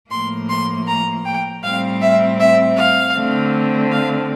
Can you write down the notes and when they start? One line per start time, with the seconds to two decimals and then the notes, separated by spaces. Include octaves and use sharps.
0.11 A2 F3 A#3 C6
0.49 C6
0.87 A#5
1.25 G5
1.63 A2 G3 C4 F5
2.02 E5
2.40 E5
2.78 F5
3.16 D3 A3 C4
3.92 F5